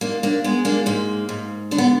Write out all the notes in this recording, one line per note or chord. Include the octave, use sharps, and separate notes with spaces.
G#2 A#3 D4
A#3 D4
G#3 B3
A#3 D4
G#2 A#3
G#2
D3 D4
B3